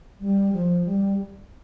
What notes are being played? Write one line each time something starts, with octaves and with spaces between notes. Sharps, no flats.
G3
F3
G3